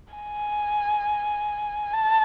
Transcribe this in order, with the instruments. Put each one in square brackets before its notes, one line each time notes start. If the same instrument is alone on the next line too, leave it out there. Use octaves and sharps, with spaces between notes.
[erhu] G#5
A5